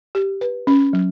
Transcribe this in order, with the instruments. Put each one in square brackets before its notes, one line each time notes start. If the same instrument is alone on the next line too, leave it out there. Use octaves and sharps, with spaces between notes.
[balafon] G4
B4
C#4
F#3